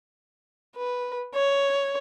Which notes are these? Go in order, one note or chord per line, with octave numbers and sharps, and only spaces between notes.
B4
C#5